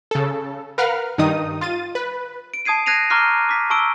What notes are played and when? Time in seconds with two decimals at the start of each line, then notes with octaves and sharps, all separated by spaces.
0.11 C#3 A4
0.78 A#4 B4 F5 F#5 F6
1.18 G2 D#3 D#4 D#6
1.61 F4 A6 D#7
1.95 B4
2.54 D7
2.65 A5 D#6 G#6 C7 D#7
2.86 F#6 G#6 A#6 C7 D#7 F7
3.10 A#5 C#6 D6 F6 F#6 C7
3.49 D6 B6
3.70 A5 A#5 C#6 E6 D7 G7